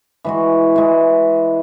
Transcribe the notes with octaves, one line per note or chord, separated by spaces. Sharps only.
E3 G#3 F#4
E3 G#3